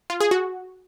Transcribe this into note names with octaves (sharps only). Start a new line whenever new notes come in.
F4
G#4
F#4